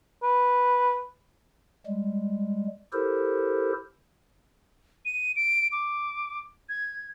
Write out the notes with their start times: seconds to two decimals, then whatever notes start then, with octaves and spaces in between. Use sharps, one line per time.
0.23 B4
1.86 G3 G#3
2.93 E4 G4 A4 A#4 C5
5.05 D#7
5.36 D7
5.72 D6
6.69 G#6